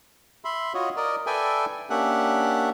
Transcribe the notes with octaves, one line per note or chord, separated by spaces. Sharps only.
E5 B5 C6
F4 F#4 C#5 D#5
A#4 D5 D#5
A4 B4 D5 E5 G5 G#5
A#3 C#4 D4 G4 E5 F#5